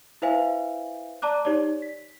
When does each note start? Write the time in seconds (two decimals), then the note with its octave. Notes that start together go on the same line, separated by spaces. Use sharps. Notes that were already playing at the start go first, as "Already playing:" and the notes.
0.22 E4 B4 C5 E5 F5 G#5
1.22 D5 A5 A#5 D6 F#6
1.45 D#4 G4 C#5 D5
1.82 B6